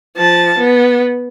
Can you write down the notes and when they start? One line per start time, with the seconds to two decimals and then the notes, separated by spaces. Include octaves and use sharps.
0.17 F3 A5
0.58 B3